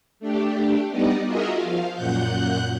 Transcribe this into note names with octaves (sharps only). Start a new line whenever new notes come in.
A3 D4 G4
G3 B3 D#4 D5 D#5
F4 F#4 G#4 A#4 D#5 E5
F3 F5
F#2 A#2 F#5 F#6 G6